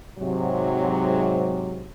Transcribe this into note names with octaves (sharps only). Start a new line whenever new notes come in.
G#2 C3 F#3